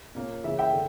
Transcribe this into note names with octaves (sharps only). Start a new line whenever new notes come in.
A#2 A#3 C#4
C#3 E3 A#3 C#4 E5
E5 G5
D3